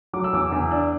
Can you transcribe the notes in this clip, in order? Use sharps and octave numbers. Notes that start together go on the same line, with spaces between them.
F#3 D6
E6
E2 D6
E2
D4